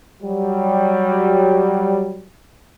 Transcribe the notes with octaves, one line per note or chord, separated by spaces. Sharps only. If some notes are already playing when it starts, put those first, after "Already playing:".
F#3 G3